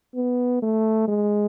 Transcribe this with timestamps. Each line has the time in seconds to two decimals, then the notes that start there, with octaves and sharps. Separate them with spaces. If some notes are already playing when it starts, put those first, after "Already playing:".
0.15 B3
0.62 A3
1.08 G#3